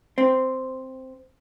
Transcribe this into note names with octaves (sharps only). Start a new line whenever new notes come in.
C4